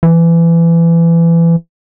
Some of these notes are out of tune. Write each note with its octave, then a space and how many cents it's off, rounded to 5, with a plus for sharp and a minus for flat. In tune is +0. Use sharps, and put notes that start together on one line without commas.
E3 +25